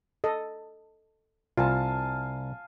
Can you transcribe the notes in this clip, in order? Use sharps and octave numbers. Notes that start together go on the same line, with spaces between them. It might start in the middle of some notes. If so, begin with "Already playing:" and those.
A4 D#5
C2 F4 F5 G#5 A5